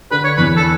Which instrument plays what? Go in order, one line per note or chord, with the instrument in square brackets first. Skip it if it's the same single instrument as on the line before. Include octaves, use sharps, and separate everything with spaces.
[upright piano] D3 [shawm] B4
[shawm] C#5
[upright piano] E2 [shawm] B4
[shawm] A4